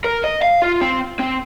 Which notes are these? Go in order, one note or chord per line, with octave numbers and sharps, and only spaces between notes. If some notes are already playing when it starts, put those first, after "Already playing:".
A#4
D#5
F5
F4
C4
C4